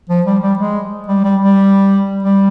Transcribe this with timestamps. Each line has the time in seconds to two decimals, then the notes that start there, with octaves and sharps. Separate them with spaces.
0.09 F3
0.26 G3
0.42 G3
0.59 G#3
1.08 G3
1.24 G3
1.41 G3
2.23 G3